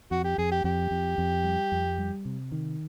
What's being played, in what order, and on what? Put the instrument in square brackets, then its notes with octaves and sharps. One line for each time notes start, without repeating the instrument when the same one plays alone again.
[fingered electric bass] F2 [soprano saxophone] F#4
[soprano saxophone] G4
[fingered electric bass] F2 [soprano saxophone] G#4
[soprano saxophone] G4
[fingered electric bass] F2 [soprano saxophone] G4
[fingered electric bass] F2
F2
G3
F2
G3
C3
D#3